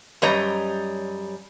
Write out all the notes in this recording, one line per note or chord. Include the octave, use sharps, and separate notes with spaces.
F#2 G3 C#5 D#5 A#5